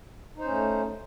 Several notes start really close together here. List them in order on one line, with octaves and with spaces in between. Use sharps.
D#4 C5 C#4 A3